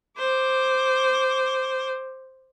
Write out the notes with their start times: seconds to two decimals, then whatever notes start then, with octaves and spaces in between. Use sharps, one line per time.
0.18 C5 D6